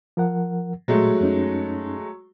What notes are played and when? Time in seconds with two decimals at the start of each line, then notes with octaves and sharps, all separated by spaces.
0.17 F3 A#4 F#5
0.88 A#2 F#3 G#3 A3
1.21 F#2 C#4 D#4